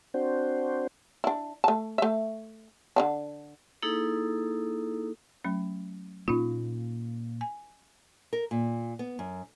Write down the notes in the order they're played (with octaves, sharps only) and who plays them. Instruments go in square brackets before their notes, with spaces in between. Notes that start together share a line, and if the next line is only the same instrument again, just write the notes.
[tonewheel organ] C4 D4 F#4 C5
[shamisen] D4 E4
A3 A5
A3 E5
D3 E3 D4
[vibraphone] A#3 D#4 E4 G#4 A4
[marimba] F#3 A3 C#4
[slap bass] A#2 A#3 [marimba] C#4 D#4 F4
[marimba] G#5
[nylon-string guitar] A#4
A#2
B3
F#2